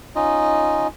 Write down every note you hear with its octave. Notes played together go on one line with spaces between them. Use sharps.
C#4 D#4 F4 D#5